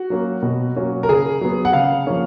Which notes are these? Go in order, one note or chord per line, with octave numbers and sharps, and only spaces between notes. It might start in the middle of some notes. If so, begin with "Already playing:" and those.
Already playing: F#4
F#3 A#3 C#4
B2
F#3 A#3 C#4
A#4
C#3 G#4
F#3 B3
F#5
C#3 F5
F3 A#3 C#4